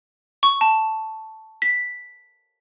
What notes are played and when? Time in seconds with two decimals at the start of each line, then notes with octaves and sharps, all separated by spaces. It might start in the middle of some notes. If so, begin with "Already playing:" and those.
0.43 C#6
0.61 A5
1.62 B6